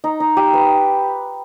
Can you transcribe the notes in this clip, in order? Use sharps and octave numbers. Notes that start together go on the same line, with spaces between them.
D#4
D#4
G4
B4